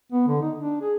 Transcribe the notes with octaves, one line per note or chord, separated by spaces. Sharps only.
B3
D3
D#4
D4
G#4